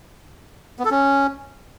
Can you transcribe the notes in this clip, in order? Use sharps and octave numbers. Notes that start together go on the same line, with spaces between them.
B3
A4
C#4